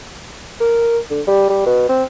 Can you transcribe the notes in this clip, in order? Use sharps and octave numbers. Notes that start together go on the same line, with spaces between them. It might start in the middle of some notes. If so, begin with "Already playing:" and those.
A#4
D3
G3
G3
B2
C4